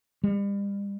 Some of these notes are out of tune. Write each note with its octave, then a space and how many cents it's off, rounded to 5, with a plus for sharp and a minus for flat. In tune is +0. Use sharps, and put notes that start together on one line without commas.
G3 +40